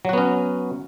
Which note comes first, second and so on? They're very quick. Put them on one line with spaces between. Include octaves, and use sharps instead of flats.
F#3 F#4 B3 C#4